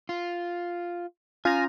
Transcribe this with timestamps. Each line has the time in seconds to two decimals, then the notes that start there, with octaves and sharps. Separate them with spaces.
0.09 F4
1.45 C#4 F4 G#5 A#5